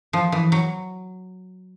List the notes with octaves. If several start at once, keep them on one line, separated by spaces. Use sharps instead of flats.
F3
E3
F#3